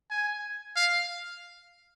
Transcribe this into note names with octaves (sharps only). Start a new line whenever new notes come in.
G#5
F5